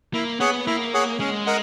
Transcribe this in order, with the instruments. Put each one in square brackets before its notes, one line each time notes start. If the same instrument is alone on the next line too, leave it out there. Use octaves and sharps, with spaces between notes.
[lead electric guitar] A#3 [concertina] E4
[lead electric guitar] B3 [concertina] G#4 C#5 F#5
[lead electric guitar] A#3 [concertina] E4
[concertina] G#4 C#5 F#5
[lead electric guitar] G#3 [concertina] C#4
[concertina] A#4 D#5 F#5